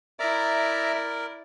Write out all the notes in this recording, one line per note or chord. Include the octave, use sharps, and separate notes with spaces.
E4 A#4 D5 E5 A#5
A#4